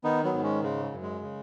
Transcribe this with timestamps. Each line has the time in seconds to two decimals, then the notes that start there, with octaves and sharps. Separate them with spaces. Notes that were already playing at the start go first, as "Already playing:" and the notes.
0.04 D#3 B3 D#4
0.24 F#3 B3
0.34 G#2
0.43 G#3 C#4
0.63 C#3 G#3
0.92 F#2
1.02 G#3
1.22 C#3